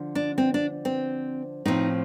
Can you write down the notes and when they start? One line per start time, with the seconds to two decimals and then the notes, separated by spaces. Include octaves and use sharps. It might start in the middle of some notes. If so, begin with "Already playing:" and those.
Already playing: D3 F3
0.15 D4
0.38 C4
0.54 D4
0.85 C4
1.65 A2 F3 C4 D#4